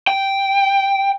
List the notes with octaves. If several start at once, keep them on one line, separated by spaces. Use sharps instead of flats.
G5